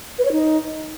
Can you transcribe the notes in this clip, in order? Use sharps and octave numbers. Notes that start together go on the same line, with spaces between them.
B4
C#5
D#4